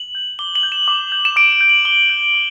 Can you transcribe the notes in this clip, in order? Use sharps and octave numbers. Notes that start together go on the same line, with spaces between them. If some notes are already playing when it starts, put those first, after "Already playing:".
Already playing: F#7
G6
D6 G7
F#7
G6
E7
D6
G6
E7
D6 D7
E7
G6
F#7
D6 G7
G6
D6